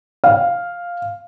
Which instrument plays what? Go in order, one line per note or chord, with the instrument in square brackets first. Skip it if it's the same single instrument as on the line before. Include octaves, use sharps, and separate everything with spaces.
[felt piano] F5